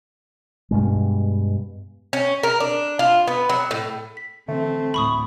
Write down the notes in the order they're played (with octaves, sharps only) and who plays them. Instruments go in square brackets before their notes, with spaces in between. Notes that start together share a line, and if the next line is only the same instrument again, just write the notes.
[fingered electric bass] G2 B2 G#3
[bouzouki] C#4
A#4
D4
F4
B3
F#3
A2
[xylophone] B6
[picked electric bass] D3 E3 [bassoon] A3 [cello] C4
[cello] D2 A2 [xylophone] B5 C#6 D#6